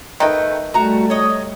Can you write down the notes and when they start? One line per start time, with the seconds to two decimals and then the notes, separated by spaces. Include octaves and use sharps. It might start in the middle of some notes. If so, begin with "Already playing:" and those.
0.20 D#3 A3 B4 G5
0.74 G3 A3 F#4 A#5
1.10 C#5 D#5